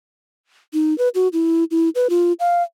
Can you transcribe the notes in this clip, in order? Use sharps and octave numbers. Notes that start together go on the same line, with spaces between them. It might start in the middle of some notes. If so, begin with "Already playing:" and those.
D#4
B4
F#4
E4
E4
B4
F4
F5